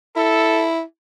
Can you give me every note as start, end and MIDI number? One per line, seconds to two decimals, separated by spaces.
0.16 0.82 64
0.16 0.67 69